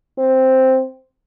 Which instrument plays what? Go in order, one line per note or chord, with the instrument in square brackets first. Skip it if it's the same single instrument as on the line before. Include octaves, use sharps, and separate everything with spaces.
[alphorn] C4